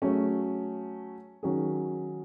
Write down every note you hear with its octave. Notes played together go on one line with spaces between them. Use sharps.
F#3 A3 C#4 G#4
D#3 F#3 C#4 G#4